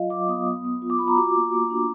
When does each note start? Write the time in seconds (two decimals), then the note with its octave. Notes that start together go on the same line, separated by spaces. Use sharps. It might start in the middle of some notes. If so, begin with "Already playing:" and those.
Already playing: F#3 F4 D#5 F5
0.10 F#3 D6
0.28 B3 D#6
0.47 B3
0.64 B3
0.82 F4
0.90 D6
0.99 F4 B5
1.08 A#5
1.17 F#4 D6
1.34 A#3
1.53 A#3
1.70 D4